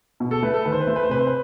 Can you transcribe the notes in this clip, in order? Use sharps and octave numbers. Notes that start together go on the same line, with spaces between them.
B2
A4
A3 B4
A4
D#3 B4
C5
B4
A3 C5
B4
C5
C3 B4
C5
B4